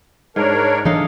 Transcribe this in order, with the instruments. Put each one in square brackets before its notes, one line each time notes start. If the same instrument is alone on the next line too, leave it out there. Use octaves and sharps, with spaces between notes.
[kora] G#2 [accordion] D4 A#4 C#5
[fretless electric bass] E3 D4 [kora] D#4 A4 F5